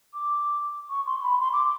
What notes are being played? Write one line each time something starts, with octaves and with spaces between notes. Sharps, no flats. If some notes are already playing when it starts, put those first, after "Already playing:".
D6
C#6
C6
C6
B5
C6
D6